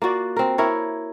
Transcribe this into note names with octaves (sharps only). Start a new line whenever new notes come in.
A#3 F4 F#4 D5
C4 A#4
E4 A#4 C#5